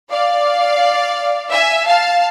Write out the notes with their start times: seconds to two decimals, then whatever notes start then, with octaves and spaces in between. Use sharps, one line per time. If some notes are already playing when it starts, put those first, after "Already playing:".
0.11 D5 F5
1.51 E5 G#5
1.85 F5 A5